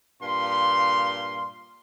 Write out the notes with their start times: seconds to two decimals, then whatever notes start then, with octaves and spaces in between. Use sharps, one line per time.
0.22 G2 A#2 F5 C6